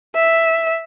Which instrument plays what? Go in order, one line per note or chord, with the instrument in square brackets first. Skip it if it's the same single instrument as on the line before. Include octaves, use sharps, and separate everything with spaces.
[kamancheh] E5